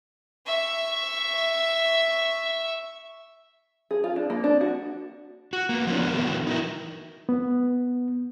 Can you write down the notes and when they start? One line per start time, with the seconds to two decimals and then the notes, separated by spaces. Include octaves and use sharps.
0.46 E5 C#6
3.91 G#4
4.04 F4
4.16 D4
4.30 A#3
4.44 D4
4.61 F#4
5.53 F#4
5.69 A#3 B3
5.87 F3 G3 C#4 D#4
6.00 B3 D4 A#4
6.13 D3 E3 F#3 A3 B3 F#4
6.47 D#4 E4 A#4
7.29 B3